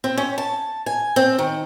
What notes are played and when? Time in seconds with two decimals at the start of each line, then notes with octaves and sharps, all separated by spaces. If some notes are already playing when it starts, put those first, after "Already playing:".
0.04 C4
0.18 C#4
0.38 A5
0.86 G#5
1.16 C4
1.39 D#3